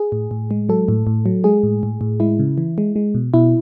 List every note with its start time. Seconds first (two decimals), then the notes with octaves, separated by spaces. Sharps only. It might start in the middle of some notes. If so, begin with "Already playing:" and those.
Already playing: G#4
0.12 A2
0.31 A2
0.51 G#3
0.69 F#3 A4
0.88 A2
1.07 A2
1.26 F#3
1.44 G#3 G#4
1.63 A2
1.83 A2
2.01 A2
2.20 G#3 E4
2.39 C#3
2.58 E3
2.78 G#3
2.96 G#3
3.15 B2
3.34 B2 E4